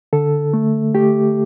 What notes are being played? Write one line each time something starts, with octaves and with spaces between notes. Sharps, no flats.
D3 A4
A3
A3 G4